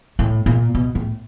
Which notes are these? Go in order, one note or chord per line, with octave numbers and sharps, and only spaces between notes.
A2
A#2
B2
A2